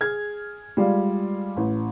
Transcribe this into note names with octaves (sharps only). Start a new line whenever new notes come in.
G#4 F6 G#6
G3 G#3 F4 D5 F5
A1